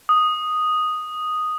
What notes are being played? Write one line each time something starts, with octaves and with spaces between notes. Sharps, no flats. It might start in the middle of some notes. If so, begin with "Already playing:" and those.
D#6